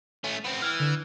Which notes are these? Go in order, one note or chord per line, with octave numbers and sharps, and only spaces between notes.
A3 C#4
B3 C4
E3 F6
D3